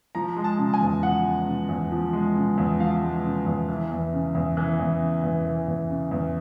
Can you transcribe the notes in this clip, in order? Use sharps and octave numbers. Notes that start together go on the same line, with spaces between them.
F3 A#5
G#3
A5
C#3
G#5
E2
F3 F#5
G#3
C#3
E2
F3
G#3
C#3
E2
F3 F5
G#3
C#3
E2
E3
E2
C#3
E2
E3
E2
C#3
E2
E3
E2
C#3
E2